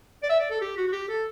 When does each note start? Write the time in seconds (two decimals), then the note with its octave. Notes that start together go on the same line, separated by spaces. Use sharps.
0.23 D5
0.29 E5
0.40 D5
0.50 A4
0.61 G4
0.77 F#4
0.88 F#4
0.92 G4
1.09 A4